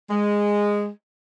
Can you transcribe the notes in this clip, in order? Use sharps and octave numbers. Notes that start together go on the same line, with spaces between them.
G#3